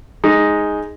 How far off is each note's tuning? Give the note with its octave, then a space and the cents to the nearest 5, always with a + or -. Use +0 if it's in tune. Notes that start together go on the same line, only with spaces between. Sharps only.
G#3 +0 D#4 +0